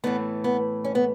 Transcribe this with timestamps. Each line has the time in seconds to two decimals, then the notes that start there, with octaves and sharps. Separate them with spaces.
0.04 A2 E3 A3 B3
0.44 B3
0.84 C#4
0.95 B3